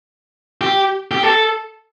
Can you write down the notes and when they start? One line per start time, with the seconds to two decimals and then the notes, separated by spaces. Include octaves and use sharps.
0.61 G4
1.11 G4
1.23 A4